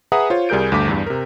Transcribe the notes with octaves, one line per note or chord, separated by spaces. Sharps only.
G#4 B4 E5 F#5 A#5 D#6
F4 C5 C#5
C2 G3 G#4 A#4 G6 D7
D2 G2 A3 D6 B6
E2 G2
C3 A#4